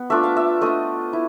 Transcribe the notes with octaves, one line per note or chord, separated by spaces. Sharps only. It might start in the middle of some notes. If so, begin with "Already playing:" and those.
Already playing: B3
A3 D4 F4 E5
F5
E5
A3 D4 F4 D#5
E4